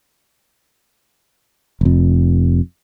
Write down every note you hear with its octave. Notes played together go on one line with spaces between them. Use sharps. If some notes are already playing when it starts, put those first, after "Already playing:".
F1 F2